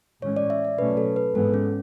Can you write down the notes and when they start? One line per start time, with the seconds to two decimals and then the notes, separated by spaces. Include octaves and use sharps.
0.22 A2 E3 G#3 C#4 C#5
0.37 D5
0.50 E5
0.65 D5
0.78 B2 F#3 A3 C#4 B4
0.97 A4
1.16 B4
1.35 G#2 E3 G#3 B3 A4
1.54 C#4